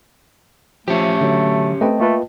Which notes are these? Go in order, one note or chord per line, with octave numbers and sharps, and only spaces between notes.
F3 A3 C#4 G4
D3 F#3
A3 C4 B4 D#5 G5 A5
A3 A#3 F4 B4